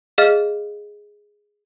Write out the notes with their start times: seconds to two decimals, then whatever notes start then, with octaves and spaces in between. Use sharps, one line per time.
0.18 G#4 D#5 F5 F6